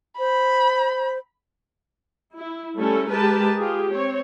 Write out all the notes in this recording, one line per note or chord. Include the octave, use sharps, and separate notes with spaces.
C5 B5
E4
G3 A3 C#4 E4 A4
G#3 G4 A#4 B4 A5
F4 G4 G#4
C4 C#5